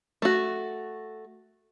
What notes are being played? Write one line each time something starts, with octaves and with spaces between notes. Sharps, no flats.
A3 F#4